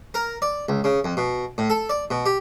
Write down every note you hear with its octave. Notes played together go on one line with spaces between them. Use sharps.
A#4
D5
C#2
C#3
F2
B2
A2
A4
D5
B2
G4